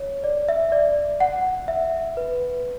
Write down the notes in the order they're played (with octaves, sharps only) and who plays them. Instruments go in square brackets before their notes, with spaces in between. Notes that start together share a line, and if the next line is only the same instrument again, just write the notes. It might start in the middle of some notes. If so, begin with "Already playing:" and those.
Already playing: [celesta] C#5
D5
E5
D5
F#5
E5
B4